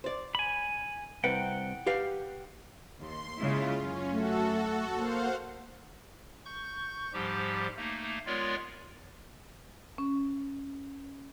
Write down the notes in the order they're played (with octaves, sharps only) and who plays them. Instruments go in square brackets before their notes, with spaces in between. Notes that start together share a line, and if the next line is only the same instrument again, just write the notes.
[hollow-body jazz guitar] C5 D5
[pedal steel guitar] G#5 B5
[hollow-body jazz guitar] C2 C4 B4 [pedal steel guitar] F#5 G5
[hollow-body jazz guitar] G4 B4 F5
[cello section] D#2 [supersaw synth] C6
[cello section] C#3 G#3 E4 [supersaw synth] F4
[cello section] F#2 [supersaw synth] C#4
[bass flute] A3 [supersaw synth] F#4 A4
[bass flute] A#3 [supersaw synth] C5 F5 F#5
[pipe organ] C#6 G6
G#2 F3 G3 G4
A3 A#3 D#4
G#3 B3 F4 A#4 C#5 D5
[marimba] C#4